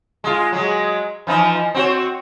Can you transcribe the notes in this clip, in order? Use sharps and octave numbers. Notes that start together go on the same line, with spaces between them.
G#3 F4
F#3 G#3
E3 F3 D#4
C4 F#4 C#5